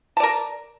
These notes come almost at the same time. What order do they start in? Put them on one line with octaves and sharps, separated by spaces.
A5 D5 A#4